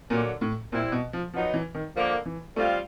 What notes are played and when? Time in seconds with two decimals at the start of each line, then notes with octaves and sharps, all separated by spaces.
0.10 A#2 D3 F#3 A#3
0.41 A2
0.72 A#2 G3 C4 E4
0.92 B2
1.13 F3
1.33 F3 F#3 B3 D#4
1.54 E3
1.74 D#3
1.95 D3 F3 A#3
2.26 E3
2.56 G3 A3 C4 F4